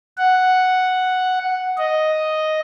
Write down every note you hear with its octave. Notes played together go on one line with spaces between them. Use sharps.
F#5
D#5